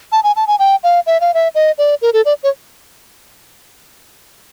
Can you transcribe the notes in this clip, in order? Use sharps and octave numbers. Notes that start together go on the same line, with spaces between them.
A5
G#5
A5
G#5
G5
F5
E5
F5
E5
D#5
D5
A#4
A4
D5
C#5